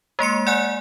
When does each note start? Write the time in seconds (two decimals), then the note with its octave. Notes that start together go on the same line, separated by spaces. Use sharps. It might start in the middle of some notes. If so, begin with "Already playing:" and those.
0.19 G#3 A#3 C6 C#7
0.47 D5 F#5 G#5 F#6